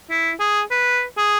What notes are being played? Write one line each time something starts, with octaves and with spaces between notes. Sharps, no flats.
E4
G#4
B4
G#4